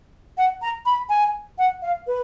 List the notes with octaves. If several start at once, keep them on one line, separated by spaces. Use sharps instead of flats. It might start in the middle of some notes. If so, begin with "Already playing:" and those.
F#5
A#5
B5
G#5
F#5
F5
B4